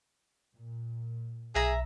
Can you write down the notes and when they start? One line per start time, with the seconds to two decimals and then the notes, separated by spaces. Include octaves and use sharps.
0.55 A#2
1.55 B1 G#4 E5 A#5